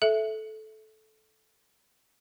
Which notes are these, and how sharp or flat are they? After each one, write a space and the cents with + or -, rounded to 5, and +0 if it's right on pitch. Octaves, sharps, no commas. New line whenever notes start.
A4 -15 E5 +0